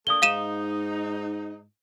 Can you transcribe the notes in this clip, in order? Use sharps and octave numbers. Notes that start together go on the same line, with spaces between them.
A3 A#3 D4 D#6 G7
G#2 D#4 F5 D#7 E7